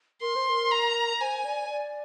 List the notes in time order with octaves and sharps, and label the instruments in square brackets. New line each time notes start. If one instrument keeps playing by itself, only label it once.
[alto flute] A#4 [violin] C6
[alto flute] C5
A#4
[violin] A#5
[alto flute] C5 [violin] G#5
[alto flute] D5
D5